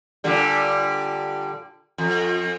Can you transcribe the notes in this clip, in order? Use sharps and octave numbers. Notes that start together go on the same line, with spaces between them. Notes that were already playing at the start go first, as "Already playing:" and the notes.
A#2 D3 G3
F2